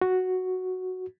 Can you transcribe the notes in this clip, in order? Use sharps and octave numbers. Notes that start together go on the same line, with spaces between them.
F#4